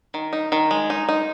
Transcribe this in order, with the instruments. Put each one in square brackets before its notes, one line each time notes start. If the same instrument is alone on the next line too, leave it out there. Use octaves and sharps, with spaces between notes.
[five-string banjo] D#3
D#4
D#3
G#3
D#4
D#4